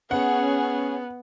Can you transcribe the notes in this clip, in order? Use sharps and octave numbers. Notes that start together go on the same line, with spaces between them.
B3 C#4 G#4 F#5